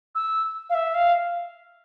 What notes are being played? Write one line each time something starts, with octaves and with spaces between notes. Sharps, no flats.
E6
F5
E5
F5